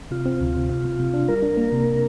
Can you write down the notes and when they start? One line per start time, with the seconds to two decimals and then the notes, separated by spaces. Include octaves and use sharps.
0.11 C3 F4
0.25 C4
0.41 D2
0.56 C3
0.69 C3
0.85 C3
1.00 C3
1.14 D4
1.28 G3 A#4
1.42 D4
1.57 A#3
1.72 C3